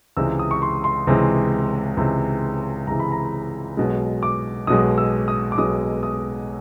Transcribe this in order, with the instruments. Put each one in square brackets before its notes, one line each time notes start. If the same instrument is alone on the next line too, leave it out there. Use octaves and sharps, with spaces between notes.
[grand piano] C#2 C3 E3 G#3 E6
D#6
C#6
C6
C6
C#2 C3 E3 G#3
C#2 C3 E3 G#3
C#2 C3 E3 G#3 A#5
B5
A#5
B1 B2 G#3
D6
B1 B2 G#3 D#6
E6
D#6
D6
B1 B2 G#3 D#6
D#6